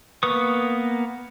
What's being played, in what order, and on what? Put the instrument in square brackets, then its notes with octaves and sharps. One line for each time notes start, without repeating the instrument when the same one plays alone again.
[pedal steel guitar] A#3 B3 B4 C#6 D#6